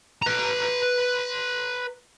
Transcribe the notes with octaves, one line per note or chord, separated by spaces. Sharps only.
B4 A#5